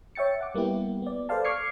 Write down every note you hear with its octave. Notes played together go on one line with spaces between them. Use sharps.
C#5 E5 G5 A6 C#7
F#5 D6
G3 A#3 B3 E4 G4
B3 D5
A4 B4 C5 D5 F5 A5
C#6 D6 F6 G#6 C7 C#7